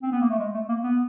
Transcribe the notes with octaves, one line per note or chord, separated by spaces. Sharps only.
C4
B3
A#3
A3
G#3
A3
A#3
B3